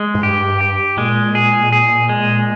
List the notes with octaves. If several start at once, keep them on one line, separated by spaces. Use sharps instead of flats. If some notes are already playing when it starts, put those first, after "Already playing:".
Already playing: G#3
G#2
G2 G4
G4
A#2 G#3
G#4
G#4
G#3